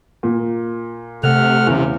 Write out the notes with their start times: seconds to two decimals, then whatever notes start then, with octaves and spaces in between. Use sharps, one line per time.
0.23 A#2
1.24 C3 A3 F#5 F6
1.67 E2 C#3